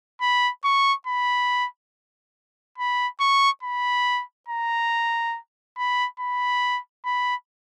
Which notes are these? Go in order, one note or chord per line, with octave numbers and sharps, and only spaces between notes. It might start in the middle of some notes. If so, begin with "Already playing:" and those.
B5
C#6
B5
B5
C#6
B5
A#5
B5
B5
B5